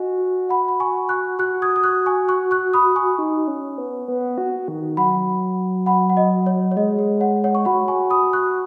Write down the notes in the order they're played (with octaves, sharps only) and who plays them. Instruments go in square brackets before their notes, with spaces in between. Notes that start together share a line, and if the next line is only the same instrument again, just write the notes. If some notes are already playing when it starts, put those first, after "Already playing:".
Already playing: [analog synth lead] F#4 [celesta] D#5 G#5
[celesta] F#5 B5
B5
G#5 C#6
C#6 F#6
[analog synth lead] F#4 [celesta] C#6 F#6
[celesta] D#6 G#6
D#6
C#6 F#6
G#5 C#6
C#6 F#6
C#6 F#6
B5 D#6
G#5 C#6
[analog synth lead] D#4
C#4
B3
B3
F#4
D#3
[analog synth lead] F#3 [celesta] F#5 B5
[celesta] F#5 B5
F#5
D#5
C#5
C#5
[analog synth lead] G#3 [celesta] D#5
[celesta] C#5
C#5 F#5
C#5 F#5
C#6
[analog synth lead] F#4 [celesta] F#5 B5
[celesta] G#5 C#6
B5 D#6
C#6 F#6